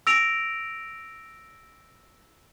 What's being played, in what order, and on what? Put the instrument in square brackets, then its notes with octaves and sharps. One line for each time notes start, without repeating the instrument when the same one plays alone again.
[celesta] E6 A#6 D7 F7